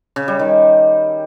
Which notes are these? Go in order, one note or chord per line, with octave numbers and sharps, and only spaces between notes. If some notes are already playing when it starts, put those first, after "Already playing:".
C#3
G3
D#3